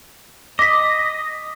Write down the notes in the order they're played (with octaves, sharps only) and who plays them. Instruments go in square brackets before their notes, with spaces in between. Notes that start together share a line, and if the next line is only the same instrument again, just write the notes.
[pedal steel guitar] D#5 [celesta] D6 B6